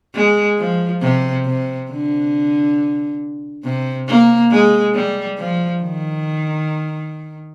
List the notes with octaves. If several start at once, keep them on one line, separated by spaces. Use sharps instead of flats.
G#3
F3
C3
C3
D3
C3
A#3
G#3
G3
F3
D#3